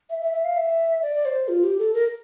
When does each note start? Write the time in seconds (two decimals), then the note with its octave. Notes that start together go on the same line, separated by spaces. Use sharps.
0.10 E5
0.21 E5
0.33 E5
0.45 F5
0.56 E5
1.02 D5
1.25 C5
1.48 F4
1.64 G4
1.79 A4
1.94 A#4